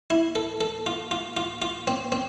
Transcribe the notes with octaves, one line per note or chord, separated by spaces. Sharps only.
E4
A4
A4
F4
F4
F4
F4
C4
C4